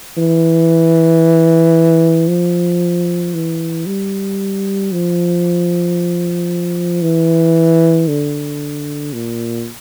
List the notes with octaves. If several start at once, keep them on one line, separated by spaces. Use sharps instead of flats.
E3
F3
E3
G3
F3
E3
D3
A#2